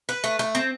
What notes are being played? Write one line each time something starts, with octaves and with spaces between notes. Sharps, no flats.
B4
A3
A3
C4